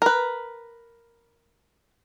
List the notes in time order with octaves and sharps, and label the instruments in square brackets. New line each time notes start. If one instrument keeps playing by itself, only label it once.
[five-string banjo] A#4 B4